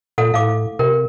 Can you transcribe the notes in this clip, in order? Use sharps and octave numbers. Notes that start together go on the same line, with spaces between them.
A#2 A4 F#5
A2 F5 D6
C3 A#4